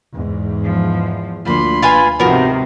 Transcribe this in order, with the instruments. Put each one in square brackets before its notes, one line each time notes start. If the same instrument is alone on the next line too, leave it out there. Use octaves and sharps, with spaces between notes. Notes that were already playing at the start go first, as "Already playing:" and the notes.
[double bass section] E2 G#2
[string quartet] F3
[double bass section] D2 [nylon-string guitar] F3 A#3 D4 [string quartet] B5 C6
[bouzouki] F4 B4 G#5
[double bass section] G#2 [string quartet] C3 D#3 [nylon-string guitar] F3 F4 F#4 [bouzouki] B3 A#4